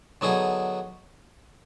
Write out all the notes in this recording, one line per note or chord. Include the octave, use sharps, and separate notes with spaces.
D3 F#3 B3 D#4 G#4